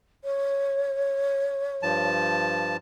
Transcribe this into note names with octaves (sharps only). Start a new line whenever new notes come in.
C#5
G2 F3 A5